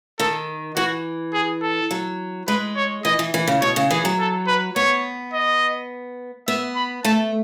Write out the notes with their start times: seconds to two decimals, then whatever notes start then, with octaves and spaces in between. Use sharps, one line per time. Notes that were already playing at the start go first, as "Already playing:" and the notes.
0.20 D#3 A4
0.76 E3 F#4
1.34 G#4
1.62 A4
1.91 F#3
2.48 G#3 B4
2.76 C#5
3.05 E3 D#5
3.19 E3
3.34 E3
3.47 C#3
3.62 B2 C#5
3.76 C#3
3.90 E3 G#4
4.05 F#3
4.19 A4
4.48 B4
4.76 B3 C#5
5.33 D#5
6.48 B3 E5
6.76 B5
7.05 A3 A5